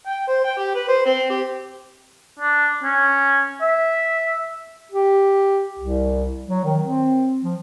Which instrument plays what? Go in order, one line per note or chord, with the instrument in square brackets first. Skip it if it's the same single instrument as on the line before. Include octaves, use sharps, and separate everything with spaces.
[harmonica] G5
C5
G5
G4
B4
C5
C4
G4
[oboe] D4
C#4
E5
[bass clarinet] G4
C2
F#3
D#3
C4
F3